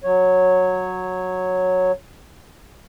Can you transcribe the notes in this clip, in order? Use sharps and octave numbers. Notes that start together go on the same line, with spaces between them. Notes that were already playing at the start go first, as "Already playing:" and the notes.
F#3 C#5